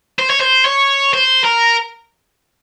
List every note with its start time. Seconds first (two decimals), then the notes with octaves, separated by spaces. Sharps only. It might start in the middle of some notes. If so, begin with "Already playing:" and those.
0.19 C5
0.30 C#5
0.41 C5
0.66 C#5
1.13 C5
1.44 A#4